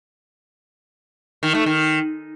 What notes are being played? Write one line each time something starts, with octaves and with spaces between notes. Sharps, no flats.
D#3
A3
D#3